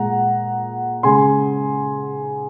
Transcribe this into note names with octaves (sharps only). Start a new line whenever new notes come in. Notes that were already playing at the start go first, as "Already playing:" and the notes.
Already playing: A#2 G#3 F#5 A#5
C#3 G#3 G#5 C6